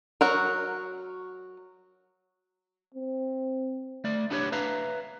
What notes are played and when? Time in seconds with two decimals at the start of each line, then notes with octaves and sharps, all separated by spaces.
0.21 F#3 F#4 A#4
2.94 C4
4.04 A3 D5
4.30 B3 D4 E4 G4 B4 C#5
4.52 B4 E5 F5 A#5